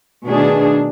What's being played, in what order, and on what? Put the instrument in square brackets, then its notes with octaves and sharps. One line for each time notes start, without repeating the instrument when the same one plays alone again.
[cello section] B2 D#3 A3 D4 G#4